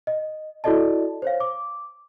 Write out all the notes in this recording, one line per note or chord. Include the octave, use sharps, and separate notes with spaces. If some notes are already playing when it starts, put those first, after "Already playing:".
D#5
E4 F#4 A4 D5 D#5 A5
C5 C#5 F5
D6